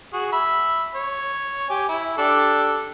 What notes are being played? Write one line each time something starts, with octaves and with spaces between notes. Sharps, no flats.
F#4 G#4
E5 B5
C#5
G4 G#5
E4
D4 G4 A4